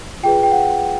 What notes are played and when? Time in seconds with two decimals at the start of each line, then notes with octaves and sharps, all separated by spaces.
0.23 F4 G#4 B4 G5
0.43 G5
0.52 F#5